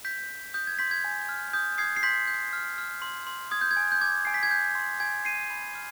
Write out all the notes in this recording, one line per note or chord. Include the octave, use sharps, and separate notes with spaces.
G6 B6
G6
D#6 G6
G#6
C6 G6 B6
G#6
G#5
F6
D#6 G6
D#6 G#6 C7
C7
C6 G6 B6
G6
F6
F6
C6
C6
D#6 G#6
G6
G#6
G#5
G6
D6 G#6
G#5 C7
B6
G#6
G6
C6
G#5 G#6
G6 C7 D#7
B5
F6